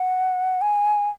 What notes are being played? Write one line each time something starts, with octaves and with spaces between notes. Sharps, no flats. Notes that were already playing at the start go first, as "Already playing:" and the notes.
Already playing: F#5
G#5